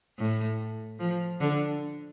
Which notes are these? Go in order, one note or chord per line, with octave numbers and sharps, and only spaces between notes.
A2
F3
D3